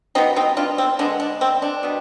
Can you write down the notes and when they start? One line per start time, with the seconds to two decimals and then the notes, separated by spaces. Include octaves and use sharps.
0.15 B2 G3 B3 C4 D#4
0.36 C4 D#4
0.57 D4 F4
0.78 C4
0.99 D3 G#3 B3 D4
1.20 D4
1.41 C4
1.62 D4
1.83 B2 G3